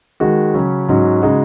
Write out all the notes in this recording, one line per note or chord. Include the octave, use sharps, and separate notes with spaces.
D#3 G#3 F#4
C#3 F#3 C#4
G#2 F#3 C#4 F#4
C#3 G#3 D#4 F#4